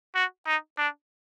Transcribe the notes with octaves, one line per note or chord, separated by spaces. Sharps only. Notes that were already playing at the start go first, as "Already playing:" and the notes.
F#4
D#4
D4